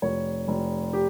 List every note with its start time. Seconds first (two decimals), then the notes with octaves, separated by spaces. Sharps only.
0.02 F1 C#5
0.48 F1
0.93 G4